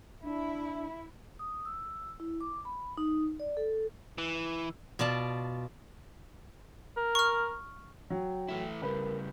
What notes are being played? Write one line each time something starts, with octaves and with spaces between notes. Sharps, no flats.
D4 E4
D#6
E6
E4
D6
B5
D#4
D5
A4
E3
B2 F4 D5 A5
A#4
C#6 F6
F#3 G5
E3 A3 E4
C#3 G3 A#4 B4